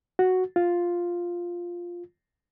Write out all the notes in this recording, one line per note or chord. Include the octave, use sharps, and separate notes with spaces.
F#4
F4